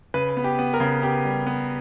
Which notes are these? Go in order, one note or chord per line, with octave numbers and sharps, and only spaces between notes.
C#3 B4
B3
G4
B3
A#4
C#3
B3 G4
G3
B3